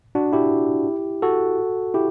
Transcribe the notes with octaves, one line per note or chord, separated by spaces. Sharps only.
D4 F#4
E4 G4
F#4 A4
E4 G4